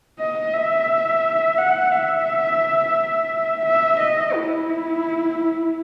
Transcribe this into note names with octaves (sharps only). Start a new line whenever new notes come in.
D#5
E5
F#5
E5
E5
D#5
E4